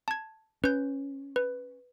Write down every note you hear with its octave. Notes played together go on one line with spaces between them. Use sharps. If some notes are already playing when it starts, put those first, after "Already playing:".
A5 G#6
C#4 B4 G6
B4